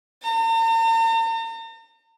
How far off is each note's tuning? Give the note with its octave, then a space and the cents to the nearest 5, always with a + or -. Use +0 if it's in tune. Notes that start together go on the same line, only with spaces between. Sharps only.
A#5 -45